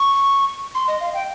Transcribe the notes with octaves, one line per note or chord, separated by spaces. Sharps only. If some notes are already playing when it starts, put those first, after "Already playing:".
Already playing: C#6
C6
D#5
F5
G5